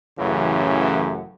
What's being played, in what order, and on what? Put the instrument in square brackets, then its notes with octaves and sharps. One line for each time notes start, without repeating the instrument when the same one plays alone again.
[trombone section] A1 F#2 A2 C#3 E3